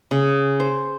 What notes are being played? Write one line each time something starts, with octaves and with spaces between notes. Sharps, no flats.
C#3
C5